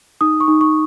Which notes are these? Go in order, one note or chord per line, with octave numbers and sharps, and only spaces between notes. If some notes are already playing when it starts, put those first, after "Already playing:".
D#4 D#6
C#6
D#4
C#6